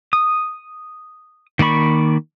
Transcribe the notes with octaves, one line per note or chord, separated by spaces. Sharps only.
D#6
D#3 A#3 D5 B5 C#6